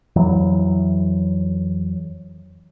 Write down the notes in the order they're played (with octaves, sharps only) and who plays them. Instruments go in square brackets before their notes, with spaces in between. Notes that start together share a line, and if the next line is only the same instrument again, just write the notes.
[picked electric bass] F2 E3 F#3